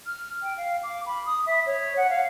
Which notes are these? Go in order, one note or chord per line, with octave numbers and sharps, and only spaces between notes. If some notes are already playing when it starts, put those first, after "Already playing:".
F6
G5
F5
D6
B5
D#6
E5
C#5
F#5
F5